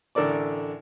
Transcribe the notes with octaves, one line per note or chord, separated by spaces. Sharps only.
A1 D3 A4 A#4 D5 D6